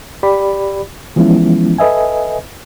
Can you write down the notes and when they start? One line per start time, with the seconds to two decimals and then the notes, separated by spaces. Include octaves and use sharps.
0.23 G4 D5 B5
1.16 E3 F3 G#3 B3 C#4 E4
1.78 A4 B4 D#5 E5 G#5